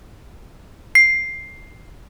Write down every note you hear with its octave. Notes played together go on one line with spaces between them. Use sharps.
C7